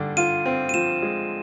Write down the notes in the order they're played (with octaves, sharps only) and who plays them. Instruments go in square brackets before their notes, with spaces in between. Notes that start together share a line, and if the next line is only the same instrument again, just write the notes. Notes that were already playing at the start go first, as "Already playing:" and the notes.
Already playing: [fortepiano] G2 D3
[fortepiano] F4 [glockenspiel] D#7
[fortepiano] C4
[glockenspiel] D#7
[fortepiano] F3 [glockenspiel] E7
[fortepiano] G#3